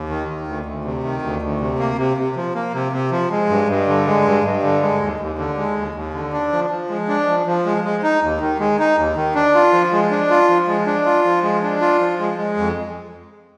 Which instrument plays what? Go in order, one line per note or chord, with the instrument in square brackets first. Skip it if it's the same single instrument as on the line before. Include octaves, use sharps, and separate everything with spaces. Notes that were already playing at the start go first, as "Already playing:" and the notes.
Already playing: [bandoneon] D#2
D#3
D#3
D2
D2
C3
D#3
D2
D2
C3
A#3
C3
C3
F3
A#3
C3
C3
F3
G#3
G2
G2
D3
G#3
G2
G2
D3
G#3
D#2
D#2
D3
G#3
D#2
D#2
D3
D4
F3
F3
G#3
D4
F3
F3
G#3
G#3
D#4
D#2
D#3
G#3
D#4
D#2
D#3
D4
F4
F3
G#3
D4
F4
F3
G#3
D4
F4
F3
G#3
D4
F4
F3
G#3
G#3
F2